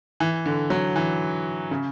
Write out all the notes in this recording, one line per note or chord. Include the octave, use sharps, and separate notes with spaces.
E3
D3
F#3
E3
C#3